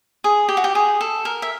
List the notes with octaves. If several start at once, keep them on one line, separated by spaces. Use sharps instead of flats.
G#4
G4
F#4
G4
G#4
A4
A#4
E5